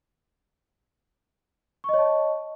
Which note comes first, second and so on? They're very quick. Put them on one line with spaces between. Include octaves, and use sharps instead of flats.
C#6 D#5 C#5 A5